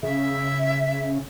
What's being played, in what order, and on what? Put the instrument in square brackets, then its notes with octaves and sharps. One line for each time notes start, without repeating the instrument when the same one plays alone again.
[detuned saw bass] C#3 [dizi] E5